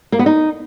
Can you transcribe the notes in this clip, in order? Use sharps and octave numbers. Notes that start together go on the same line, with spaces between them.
A#3
B3
D#4